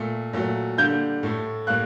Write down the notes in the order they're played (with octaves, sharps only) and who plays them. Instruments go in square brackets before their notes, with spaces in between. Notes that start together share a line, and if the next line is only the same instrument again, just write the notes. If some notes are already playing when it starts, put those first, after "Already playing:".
Already playing: [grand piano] A#2 A3
A#2 F#3 A3
D3 G3 A#3 G6
A2 A3
A2 G3 A#3 F#6